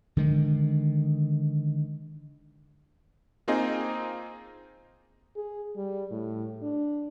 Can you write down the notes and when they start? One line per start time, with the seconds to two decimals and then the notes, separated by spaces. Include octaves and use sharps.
0.17 D3 D#3 G#3
3.48 A#3 C4 D#4 F4 G#4 D#5
5.36 G#4
5.76 G3
6.11 A2
6.62 D4